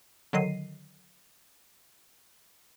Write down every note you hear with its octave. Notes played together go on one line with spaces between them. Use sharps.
D3 D#3 F#3 D#5 C7 D#7